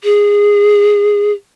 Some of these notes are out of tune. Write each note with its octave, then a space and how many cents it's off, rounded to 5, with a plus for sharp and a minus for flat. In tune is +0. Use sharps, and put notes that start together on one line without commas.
G#4 -15